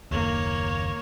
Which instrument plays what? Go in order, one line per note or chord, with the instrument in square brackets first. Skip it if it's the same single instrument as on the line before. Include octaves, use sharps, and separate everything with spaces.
[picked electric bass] F#1 D#2 [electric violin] A#3 C#5